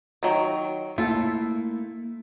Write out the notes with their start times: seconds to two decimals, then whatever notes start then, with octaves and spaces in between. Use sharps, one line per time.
0.23 D#3 F#3
0.98 A3 A#3 E4 F4 A4